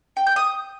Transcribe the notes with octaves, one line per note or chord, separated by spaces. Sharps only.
G5
G6
D#6